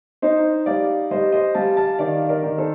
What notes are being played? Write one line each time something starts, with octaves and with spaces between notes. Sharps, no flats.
D#4 C5 D#5
G3 D5 F5
G3 C5 D#5
C5 D#5
G3 F5 A5
F5 A5
D#3 D5 F5
A#4 D5
D#3
A4 C5